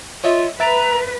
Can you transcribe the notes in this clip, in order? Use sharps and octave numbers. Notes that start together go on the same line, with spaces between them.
F4 C#5 D#5 E5
B4 E5 A#5 A6 D7